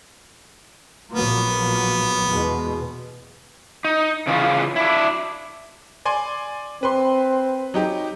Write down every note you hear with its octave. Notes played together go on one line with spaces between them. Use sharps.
A#1 F#3 A#3 B3
E2 B2 G#3
D#4
C#3 E3 C#4 F4
D4 E4
D5 G#5 C6
C4 B4 C6
F#3 D#4 G4